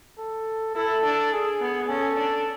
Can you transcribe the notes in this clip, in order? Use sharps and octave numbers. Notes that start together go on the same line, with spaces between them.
A4
E4 A4
D4
G#4
B3
C#4 A4
D4